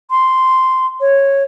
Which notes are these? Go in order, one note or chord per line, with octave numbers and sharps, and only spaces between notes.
C6
C#5